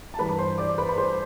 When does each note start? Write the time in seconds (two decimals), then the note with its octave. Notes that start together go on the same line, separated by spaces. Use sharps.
0.14 A5
0.19 G2 E3 B4 B5
0.29 B5
0.38 C5 C6
0.58 D5 D6
0.78 B4 B5
0.89 B5
0.98 C5 C6